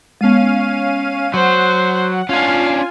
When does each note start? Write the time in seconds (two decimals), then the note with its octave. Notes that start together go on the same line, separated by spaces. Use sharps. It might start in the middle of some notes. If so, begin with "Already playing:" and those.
0.21 G#3 B3 C#4 F5 D#7
1.34 F#3 C5 F#5
2.29 C#4 D4 F4 F5 G#5